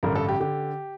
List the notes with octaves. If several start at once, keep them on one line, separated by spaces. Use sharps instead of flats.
A1 G2 D3 A#4
A4
G4
D3 G4